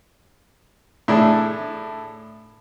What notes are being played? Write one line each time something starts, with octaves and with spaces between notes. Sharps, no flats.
A2 D4 E4 G#4 A4